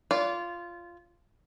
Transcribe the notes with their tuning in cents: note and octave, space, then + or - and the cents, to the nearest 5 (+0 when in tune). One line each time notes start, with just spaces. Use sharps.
F4 -10 D5 -35